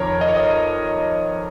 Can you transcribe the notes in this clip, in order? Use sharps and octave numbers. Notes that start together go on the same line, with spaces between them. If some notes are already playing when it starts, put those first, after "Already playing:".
Already playing: F2 D#3 A#4 C#5
D#5
C#5
D#5